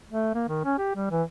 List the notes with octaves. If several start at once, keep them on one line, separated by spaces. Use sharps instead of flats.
A3
A#3
D#3
C#4
G4
G3
E3